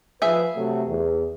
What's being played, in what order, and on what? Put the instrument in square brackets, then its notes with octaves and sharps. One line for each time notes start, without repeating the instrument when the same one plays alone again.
[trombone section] F3 B4 [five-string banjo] G#4 E5
[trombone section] C3 F#3 A3
E2